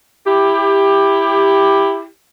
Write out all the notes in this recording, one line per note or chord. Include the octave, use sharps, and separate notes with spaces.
E4 G4